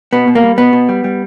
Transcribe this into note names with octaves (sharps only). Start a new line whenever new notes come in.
B2 B3
B2
A#3
G3
B2 B3
B2
G3
G3